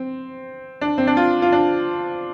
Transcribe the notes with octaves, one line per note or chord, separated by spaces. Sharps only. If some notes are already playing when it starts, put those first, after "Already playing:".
Already playing: C4
D4
C4
D4
F4
F4
D4